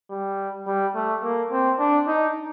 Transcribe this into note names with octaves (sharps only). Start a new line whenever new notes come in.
G3
G3
A3
A#3
C4
D4
D#4